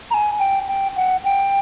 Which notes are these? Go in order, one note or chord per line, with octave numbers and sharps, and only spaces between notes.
A#5
G#5
G5
G5
F#5
G5